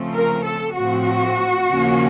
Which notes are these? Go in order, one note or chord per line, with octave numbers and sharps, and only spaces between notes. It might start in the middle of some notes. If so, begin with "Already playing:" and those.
Already playing: C#3 F3 A3 C4
A#4
A4
A2 F3 C4 F#4
D#2 C#3 F3 A#3 C#4